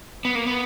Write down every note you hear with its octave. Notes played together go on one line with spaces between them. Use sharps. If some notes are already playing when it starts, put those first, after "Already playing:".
B3
A#3
B3